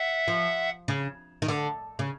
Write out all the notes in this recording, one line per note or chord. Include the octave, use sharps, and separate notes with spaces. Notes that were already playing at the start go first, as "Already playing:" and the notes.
Already playing: E5 F#5
F3
C#3
D#3
D3
C#3